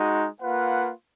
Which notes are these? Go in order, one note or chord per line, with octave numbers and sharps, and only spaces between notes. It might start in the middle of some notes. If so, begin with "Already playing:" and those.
Already playing: G#3 D#4 F#4
A#3 F4 B4 F#5